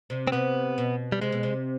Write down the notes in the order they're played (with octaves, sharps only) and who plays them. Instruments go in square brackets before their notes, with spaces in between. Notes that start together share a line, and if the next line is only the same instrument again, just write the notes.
[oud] C3
[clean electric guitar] C4
[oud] C3 [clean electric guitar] B3
[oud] B2
[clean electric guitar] G3
[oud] C3 [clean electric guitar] G#3
[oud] B2
C3